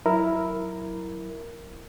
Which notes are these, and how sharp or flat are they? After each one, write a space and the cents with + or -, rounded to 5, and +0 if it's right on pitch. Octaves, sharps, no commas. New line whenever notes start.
F#3 +0 E4 +0 A#4 +0